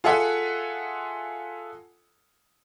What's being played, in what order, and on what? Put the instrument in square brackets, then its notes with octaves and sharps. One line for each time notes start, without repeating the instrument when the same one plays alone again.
[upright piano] F4 G#4 A4 E5 F#5 G#5